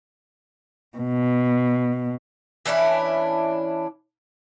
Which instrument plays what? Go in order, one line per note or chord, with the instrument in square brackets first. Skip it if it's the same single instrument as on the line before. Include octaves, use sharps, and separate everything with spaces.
[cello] B2
[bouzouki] E3 C#4 D4 E4